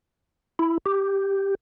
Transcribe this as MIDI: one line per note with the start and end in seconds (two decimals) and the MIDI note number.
0.59 0.78 64
0.86 1.55 67